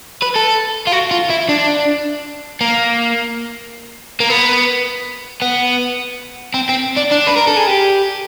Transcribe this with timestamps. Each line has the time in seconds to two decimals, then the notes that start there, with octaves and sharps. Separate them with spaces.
0.22 B4
0.36 A4
0.87 F4
0.92 F#4
1.11 F4
1.30 E4
1.49 D4
2.61 A#3
4.20 A#3
4.30 B3
5.42 B3
6.54 C4
6.69 C4
6.96 D4
7.11 D4
7.27 B4
7.37 A#4
7.47 A4
7.57 G#4
7.67 G4